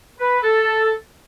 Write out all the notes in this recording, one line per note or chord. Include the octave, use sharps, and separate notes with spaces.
B4
A4